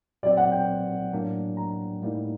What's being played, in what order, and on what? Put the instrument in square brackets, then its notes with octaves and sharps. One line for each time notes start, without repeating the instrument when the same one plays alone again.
[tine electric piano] A#2 F#3 C4 [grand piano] D5
[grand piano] F#5
G5
[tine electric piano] A2 F#3 A#3 D4
[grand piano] A#5
[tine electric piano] A2 G3 A#3 D#4